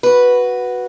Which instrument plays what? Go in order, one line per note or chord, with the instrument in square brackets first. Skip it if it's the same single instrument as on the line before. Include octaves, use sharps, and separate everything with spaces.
[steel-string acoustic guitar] F#4 B4